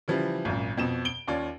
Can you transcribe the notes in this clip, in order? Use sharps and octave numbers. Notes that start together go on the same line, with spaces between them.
C#3 E3 F3 G3
G#1 F#2 A#2
F2 B2 E7
D7 G7
D#2 C#4 F4 D5